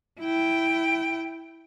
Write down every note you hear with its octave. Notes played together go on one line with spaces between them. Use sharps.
E4 G5